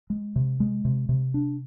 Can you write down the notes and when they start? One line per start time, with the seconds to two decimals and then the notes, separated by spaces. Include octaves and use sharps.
0.10 G#3
0.36 C3
0.60 G#3
0.85 C3
1.09 C3
1.34 D4